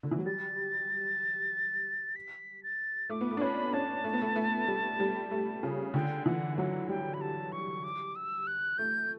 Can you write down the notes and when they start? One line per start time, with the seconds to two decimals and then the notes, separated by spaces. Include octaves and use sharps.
0.03 D3
0.11 E3
0.19 F#3
0.26 G3 A6
2.16 B6
2.63 A6
3.10 A3 D6
3.21 B3
3.31 A3
3.37 D4
3.41 C#4 B5
3.73 C#4 A5
4.04 A3
4.13 B3
4.22 A3
4.36 A3
4.67 G3
5.00 G3
5.31 A3
5.63 C#3
5.94 D3 G5
6.26 E3 F#5
6.58 F#3 F#5
6.89 G3 G5
7.14 B5
7.21 A5
7.52 C#6
7.84 D6
8.16 E6
8.47 F#6
8.78 A3 G6